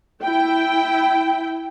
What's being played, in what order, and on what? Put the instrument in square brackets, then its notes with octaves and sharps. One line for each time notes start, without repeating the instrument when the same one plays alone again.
[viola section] E4 G5